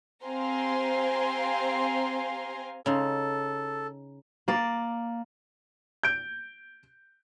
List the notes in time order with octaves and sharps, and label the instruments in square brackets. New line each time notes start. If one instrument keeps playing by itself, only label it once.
[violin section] C4 G4 F5 G#5 A#5 C6
[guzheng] C#3 D#4 C6 [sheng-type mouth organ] A4
[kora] A#3 D5
[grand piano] G6 D7